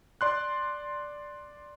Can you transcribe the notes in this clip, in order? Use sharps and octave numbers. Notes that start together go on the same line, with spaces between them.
D5 C6 F#6